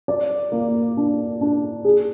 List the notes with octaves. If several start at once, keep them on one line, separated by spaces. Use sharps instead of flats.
D5
A#3
D4
D4
G#4